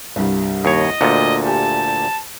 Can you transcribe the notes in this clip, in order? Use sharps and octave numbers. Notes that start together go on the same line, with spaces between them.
C2 G2 G3
D#2 C#5 D#5
D2 A#2 A6 C#7
G4 G#5 A5